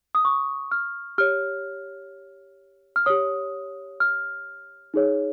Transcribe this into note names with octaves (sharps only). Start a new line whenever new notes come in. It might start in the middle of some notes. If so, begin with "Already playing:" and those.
D#6
C#6
F6
G4 C#5 F6
F6
G4 C#5 D#6
F6
D#4 G#4 C#5